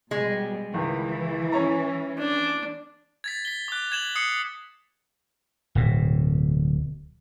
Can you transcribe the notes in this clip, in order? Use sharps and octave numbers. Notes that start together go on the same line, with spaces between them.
B2 G3 G#3
C#2 D#3 E3
C#4 C#5 A#5
D4
G#6 A6 B6
B6 G7
D6 F#6
G#6 E7 F#7 G7
D#6 C7 C#7
D1 B2